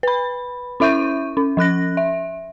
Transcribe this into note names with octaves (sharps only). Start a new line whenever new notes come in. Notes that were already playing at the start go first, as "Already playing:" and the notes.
B4 B5
C#4 E4 E5 C#6 G6 D#7
C#4
F3 C#4 F#6 A#6
E5